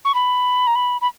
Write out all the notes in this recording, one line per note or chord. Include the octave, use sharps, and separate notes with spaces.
C#6
B5
A#5
B5
B5